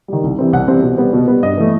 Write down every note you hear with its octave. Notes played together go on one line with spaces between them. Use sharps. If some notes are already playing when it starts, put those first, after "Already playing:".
D#3 G3
C2
C3 E3 G3 C4
C2 F#5
C3 E3 G3 C4
B2
G3 B3
B2
G3 B3
G2 D#5
E3 A3